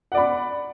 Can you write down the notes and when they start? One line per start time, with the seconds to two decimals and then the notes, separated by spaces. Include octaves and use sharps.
0.12 F#5
0.14 D5
0.17 B5